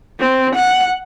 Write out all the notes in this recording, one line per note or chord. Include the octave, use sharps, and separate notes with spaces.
C4
F#5